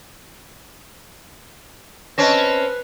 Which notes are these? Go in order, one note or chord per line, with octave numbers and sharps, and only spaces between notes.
C4 C#4 B4 D#5 A5 A#6